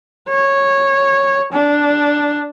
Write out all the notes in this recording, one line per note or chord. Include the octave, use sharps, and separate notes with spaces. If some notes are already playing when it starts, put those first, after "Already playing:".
C#5
D4